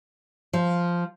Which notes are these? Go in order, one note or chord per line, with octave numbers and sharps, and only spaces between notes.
F3